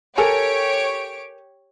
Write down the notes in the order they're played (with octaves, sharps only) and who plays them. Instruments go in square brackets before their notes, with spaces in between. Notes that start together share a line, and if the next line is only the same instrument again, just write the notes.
[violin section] G4 C#5 D7 [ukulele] A4 A#4 G#5